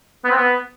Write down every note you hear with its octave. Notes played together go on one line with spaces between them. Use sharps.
B3
C4
B3